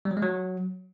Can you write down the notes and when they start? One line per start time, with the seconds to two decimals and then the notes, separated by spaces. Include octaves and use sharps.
0.05 G3
0.11 F#3
0.17 G#3
0.23 F#3